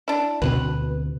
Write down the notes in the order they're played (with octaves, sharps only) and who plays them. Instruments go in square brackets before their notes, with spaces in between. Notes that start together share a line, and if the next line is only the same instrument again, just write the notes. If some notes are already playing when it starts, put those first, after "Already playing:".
[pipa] D4 E4
[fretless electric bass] D2 B2 C4 [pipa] B4